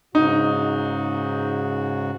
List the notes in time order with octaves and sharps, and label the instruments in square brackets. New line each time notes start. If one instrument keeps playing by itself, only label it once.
[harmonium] G#2 C#3 F#4 [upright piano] D#4